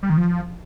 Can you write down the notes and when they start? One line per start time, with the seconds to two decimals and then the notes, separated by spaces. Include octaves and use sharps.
0.03 G3
0.10 D#3
0.17 F3